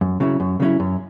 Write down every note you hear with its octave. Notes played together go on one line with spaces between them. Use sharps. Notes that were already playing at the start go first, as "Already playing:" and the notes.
F#2
C#3 F#3 C#4 E4
F#2
C#3 F#3 C#4 E4
F#2